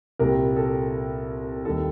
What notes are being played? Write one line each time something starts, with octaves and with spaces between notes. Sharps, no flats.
C2 A#2 G3 A#4
A4
D#2 D#3 G3 A4